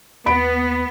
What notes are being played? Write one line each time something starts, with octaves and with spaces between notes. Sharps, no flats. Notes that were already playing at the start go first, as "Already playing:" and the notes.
D#2 B3 B5 D7